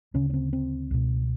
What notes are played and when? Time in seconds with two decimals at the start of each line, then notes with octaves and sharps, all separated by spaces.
0.14 D2 C#3 C#4
0.30 C#4
0.34 C4
0.53 C4
0.91 C#2 B2